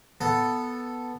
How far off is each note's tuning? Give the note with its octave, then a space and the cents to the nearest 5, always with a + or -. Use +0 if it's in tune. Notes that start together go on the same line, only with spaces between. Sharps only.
B3 +0 A4 +0